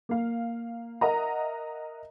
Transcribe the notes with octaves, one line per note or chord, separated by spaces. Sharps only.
A#3 F5
A#4 D#5 E5 F#5 A#5